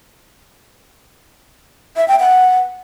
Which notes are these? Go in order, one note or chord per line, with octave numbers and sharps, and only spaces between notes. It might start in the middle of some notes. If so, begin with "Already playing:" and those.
E5
G5
F#5